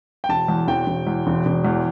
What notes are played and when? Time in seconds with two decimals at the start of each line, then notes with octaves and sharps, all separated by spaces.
0.24 G5
0.29 E1 A5
0.48 E2
0.68 E1 G5
0.87 E1
1.07 E2
1.27 E1
1.46 E1
1.65 E2